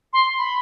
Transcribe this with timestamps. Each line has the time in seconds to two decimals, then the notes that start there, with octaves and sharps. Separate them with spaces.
0.13 C6
0.38 B5